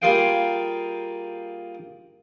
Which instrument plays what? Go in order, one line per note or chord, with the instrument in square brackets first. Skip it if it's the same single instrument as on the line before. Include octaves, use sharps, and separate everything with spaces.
[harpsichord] G3 A#3 F4 G#4 F5 G5